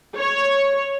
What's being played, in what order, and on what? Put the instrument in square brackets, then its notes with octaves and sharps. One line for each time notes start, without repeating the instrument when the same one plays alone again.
[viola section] C#5